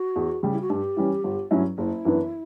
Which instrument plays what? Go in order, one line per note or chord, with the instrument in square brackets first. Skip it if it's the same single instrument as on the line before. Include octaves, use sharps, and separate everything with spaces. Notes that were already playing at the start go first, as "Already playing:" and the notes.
Already playing: [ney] F#4
[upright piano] E2
C#3 G3
[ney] E4
F#4
[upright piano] G2 [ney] G4
[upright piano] E3 G3 C#4
G1
G2 F#3 C#4 E4
[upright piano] F#1 [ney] E4
[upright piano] F#2 E3 B3 D4